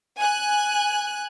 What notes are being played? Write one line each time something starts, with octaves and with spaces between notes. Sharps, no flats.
G#5 F#6